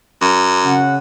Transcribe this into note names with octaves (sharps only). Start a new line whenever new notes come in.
F#2
C#3 F#5